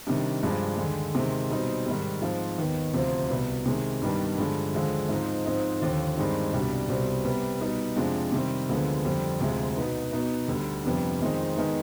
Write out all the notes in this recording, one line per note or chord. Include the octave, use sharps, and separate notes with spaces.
C3 D#3 G3 D4
G2 F3 G#3 D4
D#2 D3 G#3
C3 D#3 G#3 C4
B2 G3 C4 D#4
G#2 D#3 G3
G#2 F3 C4
D#2 D#3 B3
D2 C3 F3 C4
C2 B2 B3
C3 D#3 G#3
G2 D#3 G3 B3 D4
G2 D3 F3 G#3
D#2 D3 F3 G#3
G#2 F3 C4 D#4
G#2 F3 C4 D#4
D#2 D3 F3
G2 D#3 G#3 C4 D#4
C2 B2 G3 D4
C2 B2 G3 C4
C3 G3 B3
B2 G3 B3 D#4
F2 C3 F3 G#3 D4
C3 D#3 G3 C4
D2 D3 F3 G#3 B3
F2 D3 G3 C4
D2 C3 F3 G#3
B2 B3 D#4
B2 B3 D#4
D2 D3 G3
F2 C3 G3 B3 D4
F2 D#3 G#3 C4 D#4
D#3 G#3 B3 D#4